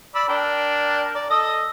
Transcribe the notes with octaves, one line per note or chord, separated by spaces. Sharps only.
D5 B5 E6
D4 A#4 G5
D5
A4 D#5 D#6